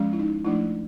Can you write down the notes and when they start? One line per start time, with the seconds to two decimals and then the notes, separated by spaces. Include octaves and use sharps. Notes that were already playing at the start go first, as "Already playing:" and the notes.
Already playing: F3 G#3 C#4
0.13 E4
0.19 D#4
0.45 F3 A3 D4 E4